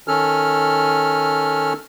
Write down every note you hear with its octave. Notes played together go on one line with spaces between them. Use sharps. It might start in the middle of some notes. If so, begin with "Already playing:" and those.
D#3 C#4 A4 F6